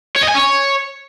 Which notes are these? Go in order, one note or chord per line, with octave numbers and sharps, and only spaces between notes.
C#5
D#5
G#5
C#5